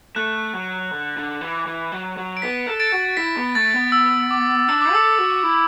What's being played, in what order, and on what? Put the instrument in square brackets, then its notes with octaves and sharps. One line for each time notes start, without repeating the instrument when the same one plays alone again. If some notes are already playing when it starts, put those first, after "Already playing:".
[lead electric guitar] A3 [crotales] F#6
[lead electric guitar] F#3
D3
D3
E3
E3
F#3
F#3
[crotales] D7
[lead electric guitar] B3 [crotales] B6
[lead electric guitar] A4
[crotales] A6 D7
[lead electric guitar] F#4
[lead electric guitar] E4 [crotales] B6
[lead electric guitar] B3
[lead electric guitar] A3 [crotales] A6
[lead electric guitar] B3
[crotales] E6
D6
[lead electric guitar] D4 [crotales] E6
[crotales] D6
[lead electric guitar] A4 [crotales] E6
[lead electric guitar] F#4
E4